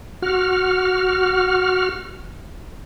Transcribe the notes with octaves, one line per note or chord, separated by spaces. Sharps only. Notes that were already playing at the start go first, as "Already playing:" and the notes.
F#4 F6